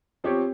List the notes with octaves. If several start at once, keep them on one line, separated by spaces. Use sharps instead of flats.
F3 C4 G4 C#5